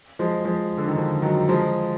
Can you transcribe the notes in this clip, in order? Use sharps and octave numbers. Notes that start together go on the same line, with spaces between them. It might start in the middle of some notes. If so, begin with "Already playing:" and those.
F3 G#3
F3 G#3
D3
D#3
D3 F3
D#3 F#3
F3 G#3